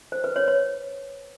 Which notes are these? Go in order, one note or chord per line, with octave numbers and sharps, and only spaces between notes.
C5
B4
C#5
C#5